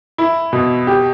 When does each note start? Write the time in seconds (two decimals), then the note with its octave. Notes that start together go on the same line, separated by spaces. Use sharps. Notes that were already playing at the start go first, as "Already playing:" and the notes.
0.18 E4
0.53 B2
0.87 G4